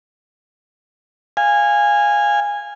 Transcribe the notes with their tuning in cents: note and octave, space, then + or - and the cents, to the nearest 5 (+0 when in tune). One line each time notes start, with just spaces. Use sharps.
F5 +0 G#5 -15